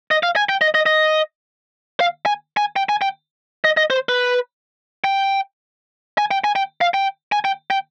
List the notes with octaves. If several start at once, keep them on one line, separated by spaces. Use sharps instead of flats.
D#5
F5
G#5
G5
D#5
D#5
D#5
F5
G#5
G#5
G5
G#5
G5
D#5
D#5
C5
B4
G5
G#5
G5
G#5
G5
F5
G5
G#5
G5
G5